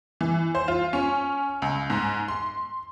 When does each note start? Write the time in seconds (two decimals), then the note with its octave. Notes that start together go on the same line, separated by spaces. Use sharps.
0.21 E3
0.55 C5
0.68 F4
0.93 C#4
1.62 C#2
1.90 G#2
2.28 C6